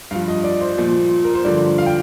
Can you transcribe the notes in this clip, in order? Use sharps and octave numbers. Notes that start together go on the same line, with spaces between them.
G2 F3 F5
D#5
D5
C5
A#2 F3
A#4
C5
G2 D3 F3 D5
F5
G5